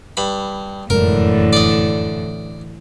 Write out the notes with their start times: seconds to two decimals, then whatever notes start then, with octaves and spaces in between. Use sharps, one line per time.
0.17 G2 B5
0.90 F1 F#2 A2 D3 E3 G#3 A#4
1.53 D5 D#5